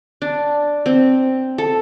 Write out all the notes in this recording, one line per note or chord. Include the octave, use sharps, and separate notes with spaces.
D4
C4
A4